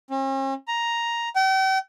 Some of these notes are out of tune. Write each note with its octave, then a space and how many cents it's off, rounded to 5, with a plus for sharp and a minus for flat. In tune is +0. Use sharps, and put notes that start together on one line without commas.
C#4 -45
A#5 +5
G5 -40